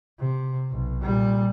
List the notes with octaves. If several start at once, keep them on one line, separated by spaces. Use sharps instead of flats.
C3
B1
A#2 G3